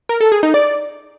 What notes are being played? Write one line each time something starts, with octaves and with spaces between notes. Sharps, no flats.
A#4
A4
G#4
D#4
D5